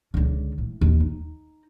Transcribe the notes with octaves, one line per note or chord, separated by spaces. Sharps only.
C#2 D3
A2
D#2
D#4